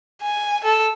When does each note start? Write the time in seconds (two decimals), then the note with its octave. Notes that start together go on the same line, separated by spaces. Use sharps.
0.22 G#5
0.64 A4